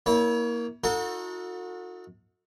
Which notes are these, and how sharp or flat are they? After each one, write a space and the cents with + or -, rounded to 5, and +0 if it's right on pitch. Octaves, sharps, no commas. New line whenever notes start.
A#3 +15 E4 -30 C#5 +30
D#4 +35 F#4 -35 A4 +35